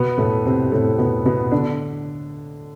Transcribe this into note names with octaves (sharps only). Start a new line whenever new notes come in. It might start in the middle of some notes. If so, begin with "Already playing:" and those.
Already playing: B2 B3
A2 A3
C3 C4
A2 A3
B2 B3
B2 B3
D3 D4